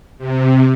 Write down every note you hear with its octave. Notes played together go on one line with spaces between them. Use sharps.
C3